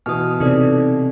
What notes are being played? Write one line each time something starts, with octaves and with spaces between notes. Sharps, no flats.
B2 E3 D#6 F6
C3 D#4 A4 D5